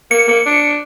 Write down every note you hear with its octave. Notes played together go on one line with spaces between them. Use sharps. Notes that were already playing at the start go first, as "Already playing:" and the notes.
A#3 C#7
A#3
D4